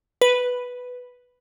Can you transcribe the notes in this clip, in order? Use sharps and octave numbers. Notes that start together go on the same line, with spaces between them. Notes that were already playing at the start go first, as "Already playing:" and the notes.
B4